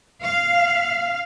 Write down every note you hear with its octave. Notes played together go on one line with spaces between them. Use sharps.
F5